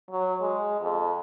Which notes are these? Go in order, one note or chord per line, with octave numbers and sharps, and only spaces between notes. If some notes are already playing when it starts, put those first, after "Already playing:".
F#3
G#3
F2